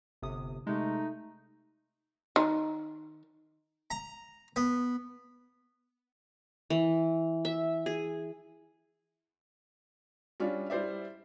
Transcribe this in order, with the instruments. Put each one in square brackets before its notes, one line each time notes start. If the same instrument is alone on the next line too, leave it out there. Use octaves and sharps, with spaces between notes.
[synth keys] G1 C3 D#6
[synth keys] C3 G#3 [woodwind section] A3 D#4
[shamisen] D#3
[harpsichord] A#5
B3
[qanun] E3
E5
G#4
[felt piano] G3 C#4 D4 F4
G3 E4 C5 D5 E5